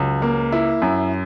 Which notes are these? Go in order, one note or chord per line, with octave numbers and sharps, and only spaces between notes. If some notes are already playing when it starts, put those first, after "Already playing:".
Already playing: C#2 F#3
A#3
E4
F#2